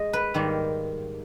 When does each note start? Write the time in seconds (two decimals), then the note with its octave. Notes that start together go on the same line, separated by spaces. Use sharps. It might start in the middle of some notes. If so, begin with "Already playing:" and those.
Already playing: G#3 D#5
0.13 B4
0.34 G#2 D#3 G3 A#3